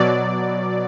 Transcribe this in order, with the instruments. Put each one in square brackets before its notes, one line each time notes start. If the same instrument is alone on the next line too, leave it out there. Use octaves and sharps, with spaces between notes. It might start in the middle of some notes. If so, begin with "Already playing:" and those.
Already playing: [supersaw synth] B2 F#3 D5